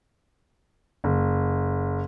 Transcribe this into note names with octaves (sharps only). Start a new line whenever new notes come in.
F#1